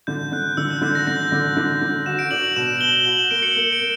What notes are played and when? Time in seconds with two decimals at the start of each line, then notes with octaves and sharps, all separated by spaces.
0.07 D3 G6
0.32 D3 F#6
0.57 D3 E6
0.70 G6
0.82 D3 G6
0.95 A#6
1.07 D3 A#6
1.32 D3
1.57 D3
1.81 D3
2.06 F#4 E7
2.19 D7
2.31 D4 F#7
2.44 F#7
2.56 B2 E7
2.81 B2 G7
3.06 F#4 F#7
3.19 E7
3.31 A#3 D7
3.43 C#7
3.56 A#3
3.73 D7
3.81 A#3